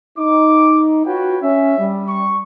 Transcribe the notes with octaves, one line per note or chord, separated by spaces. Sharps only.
D#4 D6
F4 F#4 B4 C#5 G5
C#4 E5
G3
C#6